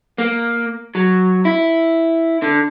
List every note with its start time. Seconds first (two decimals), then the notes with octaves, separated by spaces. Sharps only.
0.18 A#3
0.95 F#3
1.45 E4
2.42 D3